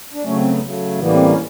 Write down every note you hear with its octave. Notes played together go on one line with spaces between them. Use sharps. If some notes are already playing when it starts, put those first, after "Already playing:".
D4
C#3 F#3 A3 C#4
C4
B3
C#3 F#3 A3
A2 E3 G3 A#3 B3
C#4
C4
C#4